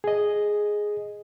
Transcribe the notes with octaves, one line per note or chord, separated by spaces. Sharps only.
G#4 D#5